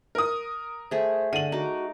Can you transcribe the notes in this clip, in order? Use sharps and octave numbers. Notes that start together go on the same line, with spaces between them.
A#4 D#6
A3 G#4 C5
D3 F#5 D#7 F#7
D#4 F#4 D6